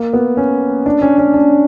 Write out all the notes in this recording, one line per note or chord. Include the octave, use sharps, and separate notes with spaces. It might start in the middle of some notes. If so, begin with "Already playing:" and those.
Already playing: A#3
B3
C#4
D4
C#4
C#4
D4